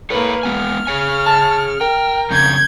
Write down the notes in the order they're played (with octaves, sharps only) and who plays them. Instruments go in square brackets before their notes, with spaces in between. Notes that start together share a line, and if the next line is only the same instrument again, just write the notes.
[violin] A#3 B4 [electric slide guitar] A4 C#5
[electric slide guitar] G#3 B3 G#5 [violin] F6
[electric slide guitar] G#4 C#5 G#5
[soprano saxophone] A5
[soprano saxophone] A#4 [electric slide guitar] G5
[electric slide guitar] F2 C#3 [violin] G6 G#6